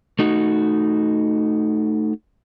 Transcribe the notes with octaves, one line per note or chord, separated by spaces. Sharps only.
A3 D#4 F#4